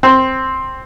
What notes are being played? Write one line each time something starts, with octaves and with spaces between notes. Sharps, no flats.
C4